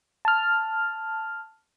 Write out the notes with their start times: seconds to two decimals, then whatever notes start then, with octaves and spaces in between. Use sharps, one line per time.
0.25 A5 F6